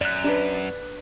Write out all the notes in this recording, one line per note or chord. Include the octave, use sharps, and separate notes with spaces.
F#2 D5 F#6
D4 B4